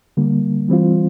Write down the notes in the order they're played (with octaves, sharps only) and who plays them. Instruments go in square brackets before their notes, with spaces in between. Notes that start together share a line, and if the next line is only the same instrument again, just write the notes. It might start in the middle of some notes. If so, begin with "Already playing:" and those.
[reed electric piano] D3 G3 A#3
E3 G3 C4 F4